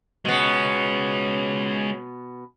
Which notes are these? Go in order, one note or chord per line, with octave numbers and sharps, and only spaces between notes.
B2 G#3 B3 C#4